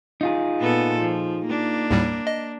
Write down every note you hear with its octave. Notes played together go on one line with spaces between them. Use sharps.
D#4 F4 G#4
A#2 B3 A4
F3
A#3 D4
D#2 A2 G3
D#5